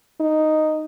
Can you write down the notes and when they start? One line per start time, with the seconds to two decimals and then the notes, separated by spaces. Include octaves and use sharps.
0.20 D#4